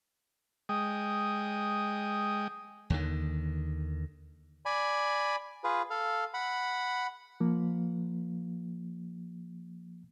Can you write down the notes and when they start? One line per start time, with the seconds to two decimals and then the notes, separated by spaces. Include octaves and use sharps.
0.69 G#3 G5 D#6
2.90 D#2 D3 D#3
4.65 D5 G#5 B5
5.64 F4 G#4 B4
5.90 A4 F5
6.34 F#5 B5
7.40 F3 A#3